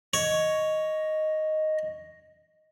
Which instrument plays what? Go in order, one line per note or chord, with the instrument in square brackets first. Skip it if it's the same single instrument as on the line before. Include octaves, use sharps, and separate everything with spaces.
[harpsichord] C#5 [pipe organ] D#5